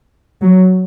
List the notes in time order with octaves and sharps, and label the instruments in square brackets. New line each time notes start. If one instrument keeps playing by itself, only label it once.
[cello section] F#3